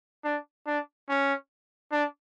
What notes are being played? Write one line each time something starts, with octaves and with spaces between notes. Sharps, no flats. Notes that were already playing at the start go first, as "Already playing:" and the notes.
D4
D4
C#4
D4